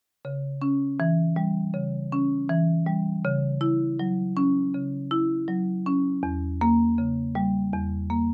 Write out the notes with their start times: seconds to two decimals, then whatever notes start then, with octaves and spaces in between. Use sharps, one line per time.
0.25 C#3
0.62 C#4
1.00 E3
1.36 G3
1.74 C#3
2.12 C#4
2.50 E3
2.86 G3
3.25 C#3
3.61 E4
3.99 F#3
4.37 C#4
4.74 C#3
5.11 E4
5.48 F#3
5.86 C#4
6.23 E2
6.61 A#3
6.98 C#3
7.35 G3
7.73 E2
8.10 A#3